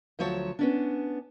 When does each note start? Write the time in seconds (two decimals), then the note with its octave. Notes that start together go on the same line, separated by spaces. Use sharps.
0.19 D2 F3 F#3 C#5 A5
0.59 B3 C#4 D4